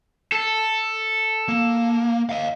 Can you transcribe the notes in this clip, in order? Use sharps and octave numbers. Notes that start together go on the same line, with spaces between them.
A4
A#3
D#5 F5